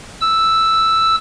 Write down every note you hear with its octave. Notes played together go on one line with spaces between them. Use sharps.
E6